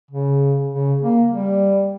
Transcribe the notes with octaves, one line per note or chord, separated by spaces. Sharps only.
C#3
C#3
A#3
G3